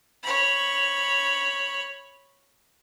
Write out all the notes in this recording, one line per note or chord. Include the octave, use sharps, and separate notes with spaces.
C#5 B5